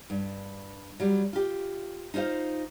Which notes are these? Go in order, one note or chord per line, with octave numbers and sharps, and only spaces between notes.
G2
F#3 G3
F4 G4
D#4 F4 G#4 C5 F5